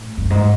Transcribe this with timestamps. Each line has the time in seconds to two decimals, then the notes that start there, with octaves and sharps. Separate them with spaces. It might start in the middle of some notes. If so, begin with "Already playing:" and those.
Already playing: A2
0.18 F#2
0.30 G#2